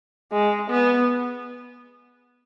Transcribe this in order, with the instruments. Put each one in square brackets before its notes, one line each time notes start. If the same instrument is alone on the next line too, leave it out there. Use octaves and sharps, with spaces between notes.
[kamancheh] G#3
B3